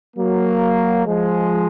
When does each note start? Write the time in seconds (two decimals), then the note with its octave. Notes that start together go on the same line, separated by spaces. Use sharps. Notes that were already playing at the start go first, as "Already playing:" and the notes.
0.17 F#3 A#3
1.06 F3 G#3